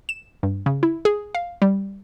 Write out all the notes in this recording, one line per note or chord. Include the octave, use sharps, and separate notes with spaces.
E7
G2
C#3
E4
G#4
F5
G3